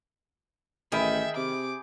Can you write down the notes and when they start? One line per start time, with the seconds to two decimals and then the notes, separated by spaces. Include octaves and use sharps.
0.92 A1 D#3 G#4 E5 G5 B5
1.37 C3 D6